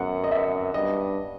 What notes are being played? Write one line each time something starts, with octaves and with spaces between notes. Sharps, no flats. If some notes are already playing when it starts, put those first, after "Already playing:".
Already playing: F#2 F#5
D#5
E5
G2 D#5